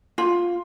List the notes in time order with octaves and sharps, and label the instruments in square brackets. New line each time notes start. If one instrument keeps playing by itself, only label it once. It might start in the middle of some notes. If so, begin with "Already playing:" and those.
[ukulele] F4